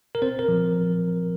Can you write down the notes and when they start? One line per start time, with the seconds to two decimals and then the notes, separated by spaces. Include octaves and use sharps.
0.15 A#4
0.22 C4 C5
0.39 A#4
0.48 F3